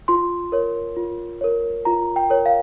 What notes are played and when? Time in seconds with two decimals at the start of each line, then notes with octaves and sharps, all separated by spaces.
0.08 F4 C6
0.52 A#4 C#5
0.96 F4
1.41 A#4 C#5
1.85 F4 A#5
2.16 G5
2.30 A#4 C#5
2.46 F5